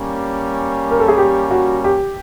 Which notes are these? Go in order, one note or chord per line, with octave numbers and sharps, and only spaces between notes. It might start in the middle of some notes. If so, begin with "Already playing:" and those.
Already playing: G3 A#3 C#4
A#4
A4
G#4
G4
F#4
G4